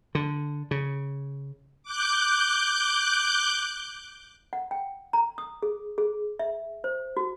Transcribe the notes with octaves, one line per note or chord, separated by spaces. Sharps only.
D3
C#3
D6 F#6 G6
F#5
G5
A#5
D#6
G#4
G#4
E5
C5
F#4